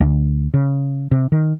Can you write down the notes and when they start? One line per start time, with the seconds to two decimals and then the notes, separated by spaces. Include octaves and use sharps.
0.01 D2
0.54 C#3
1.11 C3
1.32 D#3